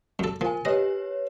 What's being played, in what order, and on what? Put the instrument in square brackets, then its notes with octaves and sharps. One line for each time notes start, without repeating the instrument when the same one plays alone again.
[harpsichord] F#2 A4
[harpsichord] F3 [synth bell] A#4 G#5
[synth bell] G4 B4 C#5 [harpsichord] D#5